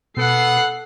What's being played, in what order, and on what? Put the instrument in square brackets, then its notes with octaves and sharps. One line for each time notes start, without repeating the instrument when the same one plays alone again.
[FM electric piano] B2 [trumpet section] B3 F#5 [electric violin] A4 C7